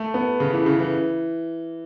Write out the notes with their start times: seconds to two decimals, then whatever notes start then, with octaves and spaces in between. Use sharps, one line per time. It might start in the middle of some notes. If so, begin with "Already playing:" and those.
Already playing: A3
0.14 B3
0.40 C#3
0.53 E3
0.66 C#3
0.79 E3